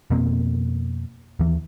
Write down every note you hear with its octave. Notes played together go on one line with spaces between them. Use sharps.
F2 B2 A#3 C4
D#2 E3